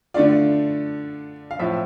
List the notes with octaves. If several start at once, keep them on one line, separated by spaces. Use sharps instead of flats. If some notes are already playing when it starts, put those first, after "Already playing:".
D3 A3 D4 F4 D5
F5
A2 F3 C4 F4 E5